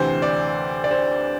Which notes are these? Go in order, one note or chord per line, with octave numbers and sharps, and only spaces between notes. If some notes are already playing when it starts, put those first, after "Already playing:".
Already playing: D2 C3 E3 C5
D5
D5
C5